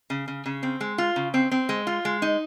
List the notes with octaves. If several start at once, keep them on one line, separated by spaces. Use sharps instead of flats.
C#3
C#3
C#3
C4
G#3
F4
C#3
C4
C4
G#3
F4
G#3
D#4